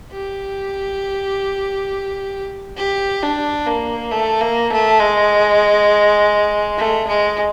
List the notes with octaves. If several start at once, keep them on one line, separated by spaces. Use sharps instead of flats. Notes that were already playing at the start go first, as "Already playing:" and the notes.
G4
G4
D4
A#3
A3
A#3
A3
G#3
A3
G#3